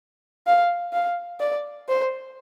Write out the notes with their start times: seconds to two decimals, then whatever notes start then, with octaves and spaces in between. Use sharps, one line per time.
0.47 F5
0.93 F5
1.40 D5
1.88 C5